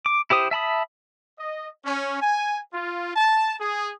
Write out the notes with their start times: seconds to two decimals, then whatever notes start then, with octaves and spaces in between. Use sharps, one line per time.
0.06 D6
0.30 E4 G4 C5 D#6
0.51 E5 A5 B5 D#6
1.39 D#5
1.85 C#4
2.22 G#5
2.74 F4
3.16 A5
3.60 G#4